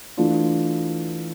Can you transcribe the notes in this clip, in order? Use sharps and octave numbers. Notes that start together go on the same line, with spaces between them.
E3 A3 D4 F4